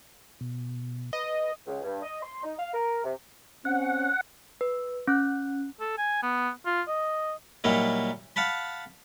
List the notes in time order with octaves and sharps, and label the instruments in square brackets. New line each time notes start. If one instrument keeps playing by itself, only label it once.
[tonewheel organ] B2
[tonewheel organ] B4 [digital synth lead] D#5
[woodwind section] C#2
G2
D#5
C6
D#4
F5
A#4
C3
[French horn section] C4 C#4 [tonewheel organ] F#5
[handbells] B4
C#4 F#6
[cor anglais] A4
G#5
B3
F4
D#5
[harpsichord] A#2 F#3 G3 A#3 D#4 E4
F5 F#5 A5 B5